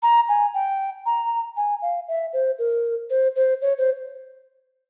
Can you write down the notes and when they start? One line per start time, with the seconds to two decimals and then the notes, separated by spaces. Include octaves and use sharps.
0.03 A#5
0.29 G#5
0.54 G5
1.06 A#5
1.57 G#5
1.82 F5
2.08 E5
2.33 C5
2.59 A#4
3.10 C5
3.36 C5
3.62 C#5
3.78 C5